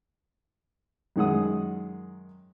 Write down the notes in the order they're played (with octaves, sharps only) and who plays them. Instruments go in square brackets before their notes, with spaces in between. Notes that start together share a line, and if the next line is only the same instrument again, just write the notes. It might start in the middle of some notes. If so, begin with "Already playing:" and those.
[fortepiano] F#2 D#3 G#3 F#5 D#6